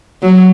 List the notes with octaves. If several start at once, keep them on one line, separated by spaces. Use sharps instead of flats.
F#3